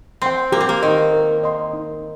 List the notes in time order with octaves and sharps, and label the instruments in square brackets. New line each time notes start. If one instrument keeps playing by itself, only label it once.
[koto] C4 [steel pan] G5 C6
[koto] A#3 [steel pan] G4
[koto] C4
A#3
[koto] D#3 [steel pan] D#5 C6
[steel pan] A#4
D#5 C6
D#4